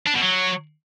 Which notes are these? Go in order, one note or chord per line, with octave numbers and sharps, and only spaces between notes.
D4
B2
F#3